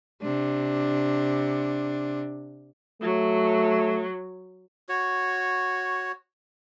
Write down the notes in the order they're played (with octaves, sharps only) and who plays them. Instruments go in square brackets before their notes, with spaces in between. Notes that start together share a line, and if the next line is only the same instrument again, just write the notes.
[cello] C3 D4
[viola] F#3 [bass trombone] A3
[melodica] F#4 C#5